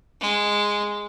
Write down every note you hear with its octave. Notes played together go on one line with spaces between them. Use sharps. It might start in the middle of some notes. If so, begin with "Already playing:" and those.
G#3